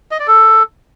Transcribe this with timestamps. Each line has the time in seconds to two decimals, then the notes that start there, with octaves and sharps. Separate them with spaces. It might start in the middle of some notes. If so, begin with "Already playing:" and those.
0.11 D#5
0.19 D5
0.28 A4